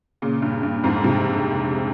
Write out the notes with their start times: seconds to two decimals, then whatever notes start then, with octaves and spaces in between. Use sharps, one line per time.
0.22 A#2 C#3
0.42 G2 A#2
0.63 G2 A#2
0.84 F2 G#2
1.04 G#2 C3